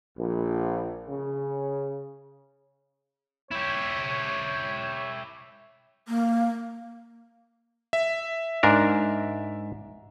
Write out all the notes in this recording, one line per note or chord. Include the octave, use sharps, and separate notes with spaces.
A#1
C#3
E4 G4 C#5
A#3
E5
G#2 D4 A#4